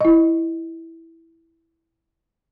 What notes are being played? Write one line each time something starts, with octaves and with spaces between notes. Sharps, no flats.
E4 D#5